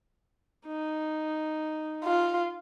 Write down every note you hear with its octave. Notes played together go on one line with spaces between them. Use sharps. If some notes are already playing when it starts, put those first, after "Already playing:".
D#4
F4